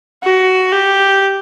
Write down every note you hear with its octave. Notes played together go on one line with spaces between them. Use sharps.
F#4
G4